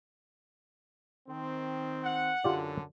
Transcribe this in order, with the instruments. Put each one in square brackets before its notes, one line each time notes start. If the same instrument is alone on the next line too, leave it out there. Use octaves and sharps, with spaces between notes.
[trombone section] D#3 C4
[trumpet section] F#5
[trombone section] F#2 D3 [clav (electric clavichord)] F4 G4 D5